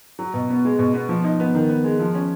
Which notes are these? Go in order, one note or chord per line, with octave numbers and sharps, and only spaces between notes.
F#3
B2
B3
G#3
B2
B3
F3
D#4
B3
D#3
B3
G#3
F3
C#4